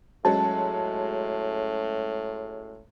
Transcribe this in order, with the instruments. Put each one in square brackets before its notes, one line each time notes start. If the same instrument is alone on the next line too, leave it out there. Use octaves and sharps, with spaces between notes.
[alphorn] A2 [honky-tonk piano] F#3 G#3 C#4 [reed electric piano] A5